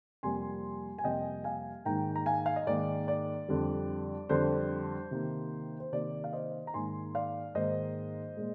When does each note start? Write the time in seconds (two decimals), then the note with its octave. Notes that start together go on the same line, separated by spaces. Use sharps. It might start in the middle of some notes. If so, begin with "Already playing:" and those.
0.23 F2 C3 G3 A#3 G#5 C6
0.99 G#5
1.04 F2 C3 G3 A#3 D#5 G5
1.44 F5 G#5
1.85 G#2 D#3 A#3 G5 A#5
2.16 A#5
2.26 F5 G#5
2.46 F5
2.56 D#5
2.67 G#2 D#3 A#3 D5
3.08 D5
3.49 F2 D3 G3
4.29 F2 D3 G3 C5
5.11 C3 D#3 A#3
5.80 C5
5.93 C3 D#3 A#3 D5
6.24 F5
6.33 C5 D#5
6.67 A#5
6.74 G#2 D#3 A#3 G#5 C6
7.15 D5 F5
7.55 G#2 D#3 A#3 C5 D#5
8.37 A#2 G#3